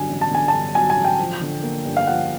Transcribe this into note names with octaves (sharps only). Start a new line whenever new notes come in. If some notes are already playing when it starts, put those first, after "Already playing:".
Already playing: G2 D3 F#3 G#5
A1
A5
D3 G#5
A5
G2
F#3 G#5
G#5
A1
G5
F3
D3
A#3
G2
F5
F3 F#5